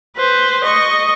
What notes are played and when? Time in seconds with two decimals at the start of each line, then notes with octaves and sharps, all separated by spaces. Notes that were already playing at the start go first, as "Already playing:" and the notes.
0.16 B4 C5
0.63 D#5 C#6